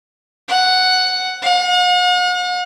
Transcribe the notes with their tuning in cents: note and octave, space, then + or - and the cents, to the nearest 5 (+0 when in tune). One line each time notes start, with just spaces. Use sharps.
F#5 +5
F#5 -45